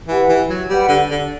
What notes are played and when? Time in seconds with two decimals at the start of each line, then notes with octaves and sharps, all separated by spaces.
0.08 E3 G4 B4 F#5 B5
0.29 E3
0.49 F#3
0.69 G3 G4 B4 F#5 B5
0.89 D3
1.10 D3